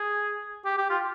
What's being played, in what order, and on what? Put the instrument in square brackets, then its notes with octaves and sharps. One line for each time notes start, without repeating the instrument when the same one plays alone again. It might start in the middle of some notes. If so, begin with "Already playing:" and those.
Already playing: [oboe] G#4
G4
G4
F4